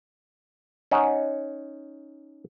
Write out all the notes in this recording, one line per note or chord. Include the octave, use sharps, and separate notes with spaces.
C#4 D#4 F#5